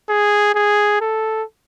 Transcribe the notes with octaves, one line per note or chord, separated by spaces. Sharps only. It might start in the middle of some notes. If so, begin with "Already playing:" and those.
G#4
G#4
A4